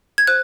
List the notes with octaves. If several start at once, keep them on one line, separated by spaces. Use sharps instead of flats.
G#6
C5 F#6